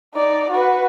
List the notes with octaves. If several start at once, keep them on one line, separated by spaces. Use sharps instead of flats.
D#4 D5
F#4 B4